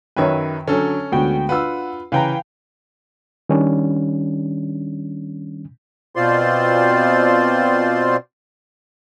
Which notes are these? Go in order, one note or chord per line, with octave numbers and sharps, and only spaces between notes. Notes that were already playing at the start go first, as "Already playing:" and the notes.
F#2 D#3 F#3 B4 C#5 E5 G5
D3 F#3 C#4 A4
D2 D3 G#3 B3 F#4 G5
D4 F4 B4 F#5 E6
C#3 E3 B4 F5 G5 A#5 B5
D#3 G3 C#4 D4
B2 C4 F4 C5 D5 C6